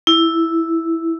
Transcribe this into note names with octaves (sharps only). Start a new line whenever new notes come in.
E4